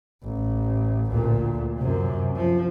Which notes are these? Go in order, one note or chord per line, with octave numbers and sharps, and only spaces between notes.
A1
D2 A#2
F#2 C3
F3